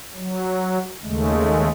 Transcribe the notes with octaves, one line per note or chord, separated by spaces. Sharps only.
F#3
D#2 C#3 G#3 A3